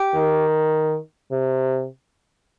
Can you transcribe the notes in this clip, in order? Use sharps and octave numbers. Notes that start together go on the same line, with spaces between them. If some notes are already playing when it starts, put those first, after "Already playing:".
Already playing: G4
D#3
C3